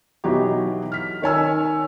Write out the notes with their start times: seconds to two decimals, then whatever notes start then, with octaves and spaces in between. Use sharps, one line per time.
0.24 B2 E3 F#3 D#4 G4
0.92 F6 B6
1.22 D#3 C#5 G#5 E6